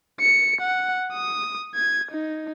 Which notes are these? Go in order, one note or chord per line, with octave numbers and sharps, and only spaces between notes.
C#7
F#5
D#6
G#6
D#4